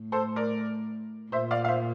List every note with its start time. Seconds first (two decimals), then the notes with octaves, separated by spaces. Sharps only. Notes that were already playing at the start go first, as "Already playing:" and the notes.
Already playing: A2
0.12 A4 C5
0.36 A#4 D5
1.32 A#2 C5 E5
1.51 D5 F5
1.65 F5
1.68 C5 E5